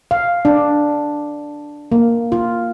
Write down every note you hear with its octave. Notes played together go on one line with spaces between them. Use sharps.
F5
D4
A#3
F4